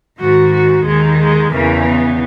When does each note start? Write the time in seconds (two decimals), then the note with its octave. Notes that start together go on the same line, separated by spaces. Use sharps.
0.19 G#2 D#3 F#4
0.52 F#4
0.85 D#2 D#3 G#3
1.19 G#3
1.51 E2 C#3 E3 A#3
1.85 B3